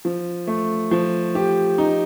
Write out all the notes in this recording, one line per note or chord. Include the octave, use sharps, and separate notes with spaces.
F3
A3
F3
G4
D#4